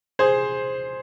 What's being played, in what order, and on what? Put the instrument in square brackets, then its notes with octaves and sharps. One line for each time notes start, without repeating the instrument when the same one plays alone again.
[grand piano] G#4 C5